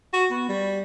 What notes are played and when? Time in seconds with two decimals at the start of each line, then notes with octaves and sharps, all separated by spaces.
0.13 F#4
0.31 B3
0.48 G3